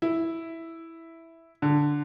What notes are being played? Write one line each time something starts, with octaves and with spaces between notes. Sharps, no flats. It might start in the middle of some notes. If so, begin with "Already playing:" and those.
E4
D3